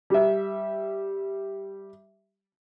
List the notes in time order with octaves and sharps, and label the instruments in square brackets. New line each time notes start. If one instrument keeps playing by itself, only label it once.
[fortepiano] G3 E5